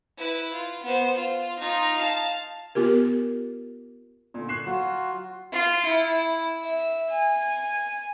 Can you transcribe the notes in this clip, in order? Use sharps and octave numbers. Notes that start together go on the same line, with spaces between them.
E4 B4
F4
B3 C5
F4
D#4 F4
F5 A5
B3 F4 G4 A#4
A#2 D3
C#6 F#6 C7 E7
F#3 F4 F#4
F4
E4
E5
G#5